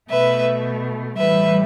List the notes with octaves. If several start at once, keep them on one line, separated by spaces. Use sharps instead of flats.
B2 A3 B4 E5
A2 E3 G3 B4 E5